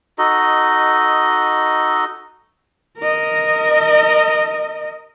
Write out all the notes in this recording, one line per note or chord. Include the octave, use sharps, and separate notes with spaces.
D#4 F#4 A4 D#5
A#4 D#5